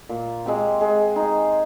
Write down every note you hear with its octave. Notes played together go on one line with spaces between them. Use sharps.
A#2
G#3 C4 G4
G#3
D#4 G#4